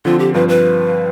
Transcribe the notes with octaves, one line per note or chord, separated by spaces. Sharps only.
D3 F3 C4 F4
G4
G2 F3 C4 F4 B4
B4